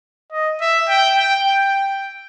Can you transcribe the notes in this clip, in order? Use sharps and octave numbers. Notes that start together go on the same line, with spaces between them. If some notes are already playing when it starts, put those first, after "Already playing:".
D#5
E5
G5
G5
G5